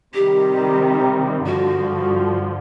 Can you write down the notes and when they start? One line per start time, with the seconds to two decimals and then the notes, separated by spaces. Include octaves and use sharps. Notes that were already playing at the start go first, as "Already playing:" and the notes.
0.14 C3 D#3 G3 G4
1.46 G2 D3 F3 F#4